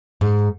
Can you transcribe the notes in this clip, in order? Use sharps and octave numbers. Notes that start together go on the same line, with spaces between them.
G#2